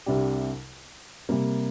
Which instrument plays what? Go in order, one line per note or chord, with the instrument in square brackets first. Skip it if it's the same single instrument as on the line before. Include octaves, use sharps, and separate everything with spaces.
[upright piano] C2 C3 G3 D4 G4
C3 G3 A#3